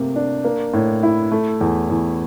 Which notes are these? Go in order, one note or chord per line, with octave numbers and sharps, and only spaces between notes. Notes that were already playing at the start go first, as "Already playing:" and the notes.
Already playing: C3 A3 A#3
D4
A#3
A2
E4
A3
E2
E2